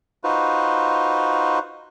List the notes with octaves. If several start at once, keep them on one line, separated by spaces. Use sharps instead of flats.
D#4 F4 F#4 B4 C5